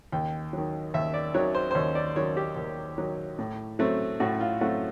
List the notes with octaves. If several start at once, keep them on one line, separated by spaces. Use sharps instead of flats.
D#2 G5
D#3 F#3
D#2 E5
D5
D#3 F#3 C#5
C5
C5
D#2 C#5
D5
D#3 F#3 C#5
G4
D#2
D#3 F#3
A2
F#3 A3 C4
A2 F#4
F4
F#3 A3 C4 F#4